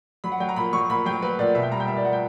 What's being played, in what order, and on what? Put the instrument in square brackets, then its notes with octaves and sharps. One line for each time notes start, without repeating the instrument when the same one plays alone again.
[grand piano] F#3 B5
F#5
F#3 G5
A#5
A#2 B5
F#3 C#6
A#2 B5
F#3 G5
F#3 B4
A#2 D5
B2 E5
G5
G3 A#5
G5
G3 E5
D5
G3 F#5
G5